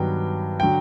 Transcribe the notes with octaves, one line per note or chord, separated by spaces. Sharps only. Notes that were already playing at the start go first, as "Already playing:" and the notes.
Already playing: G2 D#3 F#3 B3 G5
D3 F#3 G5